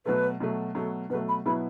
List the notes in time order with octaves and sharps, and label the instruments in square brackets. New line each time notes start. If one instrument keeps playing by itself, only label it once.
[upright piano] B2 F#3 A3 [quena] B4
[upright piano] B2 F#3 A3
[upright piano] B2 F#3 A3 [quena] A4
[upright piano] B2 [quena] B4
[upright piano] F#3 A3
[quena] B5
[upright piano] B2 F#3 B3 E4 [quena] B5